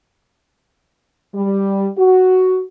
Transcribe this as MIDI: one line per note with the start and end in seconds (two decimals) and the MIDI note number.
1.35 1.88 55
1.97 2.63 66